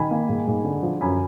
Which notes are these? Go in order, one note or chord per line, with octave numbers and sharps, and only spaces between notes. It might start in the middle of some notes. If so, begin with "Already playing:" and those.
Already playing: D#3 G#5 B5
A#3
G#2
G#2
D3
F3
F#2 G#5 B5